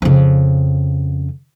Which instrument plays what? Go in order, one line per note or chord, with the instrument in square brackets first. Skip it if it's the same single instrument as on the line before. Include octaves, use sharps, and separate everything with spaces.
[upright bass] F2 C#3